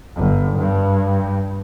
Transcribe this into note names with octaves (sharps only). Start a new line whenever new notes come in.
G1
G2